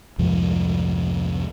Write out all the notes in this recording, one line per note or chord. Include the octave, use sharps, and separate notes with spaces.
C2 F2 G#2 F3